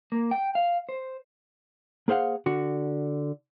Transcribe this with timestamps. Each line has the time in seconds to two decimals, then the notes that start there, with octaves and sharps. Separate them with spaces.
0.12 A#3
0.31 G5
0.55 F5
0.89 C5
2.08 A#3 G#4 C5 F5 F#5
2.46 D3 F#4